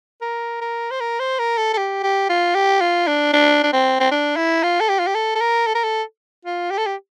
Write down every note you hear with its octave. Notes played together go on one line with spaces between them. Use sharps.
A#4
A#4
C5
A#4
C5
A#4
A4
A4
G4
G4
F4
G4
F4
D4
D4
D4
C4
C4
D4
E4
F4
A4
G4
F4
G4
A4
A4
A#4
A4
A#4
A4
F4
G4
A4
G4